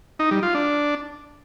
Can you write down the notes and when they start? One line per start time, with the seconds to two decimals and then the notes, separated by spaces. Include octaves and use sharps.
0.19 D#4
0.31 G3
0.43 F4
0.54 D4